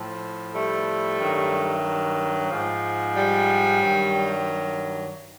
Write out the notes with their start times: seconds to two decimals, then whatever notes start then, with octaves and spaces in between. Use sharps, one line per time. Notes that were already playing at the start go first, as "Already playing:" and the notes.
Already playing: A2 F3
0.54 G3 A3
1.19 G2 D#3 F#3
2.50 G#2 F3
3.15 G3
3.79 G2 D#3 F#3